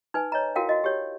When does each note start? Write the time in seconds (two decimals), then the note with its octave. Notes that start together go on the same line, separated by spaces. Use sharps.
0.14 D#4 B4 G#5
0.32 C#5 D#5 A#5
0.56 E4 F#4 A#4 F5 G5
0.69 F#4 D#5
0.84 G4 C#5